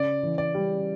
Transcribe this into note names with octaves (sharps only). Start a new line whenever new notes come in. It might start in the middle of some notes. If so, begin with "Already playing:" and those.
Already playing: C#3 D5
E3
D5
G3